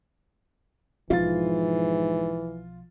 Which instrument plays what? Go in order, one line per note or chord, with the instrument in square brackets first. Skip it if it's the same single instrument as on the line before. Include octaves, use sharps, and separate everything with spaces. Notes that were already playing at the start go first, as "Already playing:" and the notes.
[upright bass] B1 F3 [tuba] G#2 [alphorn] E3 [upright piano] F4 A6